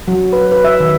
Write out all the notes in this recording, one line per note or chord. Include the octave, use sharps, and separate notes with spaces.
F#3
B4
B4
E5
D#3